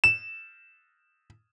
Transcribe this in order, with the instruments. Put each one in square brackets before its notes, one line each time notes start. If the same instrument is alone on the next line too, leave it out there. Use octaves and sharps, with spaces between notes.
[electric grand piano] E7